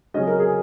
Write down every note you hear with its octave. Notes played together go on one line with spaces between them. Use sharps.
C#3 F#3 C#4 D#5
A#4
G#4